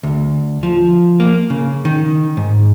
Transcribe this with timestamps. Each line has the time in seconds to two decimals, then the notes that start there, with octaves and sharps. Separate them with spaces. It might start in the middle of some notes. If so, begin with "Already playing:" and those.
0.03 D2
0.63 F3
1.20 A#3
1.50 C#3
1.85 D#3
2.37 G#2